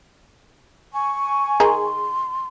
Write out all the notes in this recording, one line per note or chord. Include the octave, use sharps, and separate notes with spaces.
G#5 C#6
D#3 G#4 D#5 A#5 C6